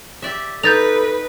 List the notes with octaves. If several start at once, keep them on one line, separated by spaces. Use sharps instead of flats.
G4 D5 E5
D#4 A4 B4 G6 A6 F7